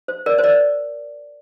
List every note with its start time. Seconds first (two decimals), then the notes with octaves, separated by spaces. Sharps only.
0.08 C5
0.26 A#4 D5
0.38 C5
0.44 A#4 D5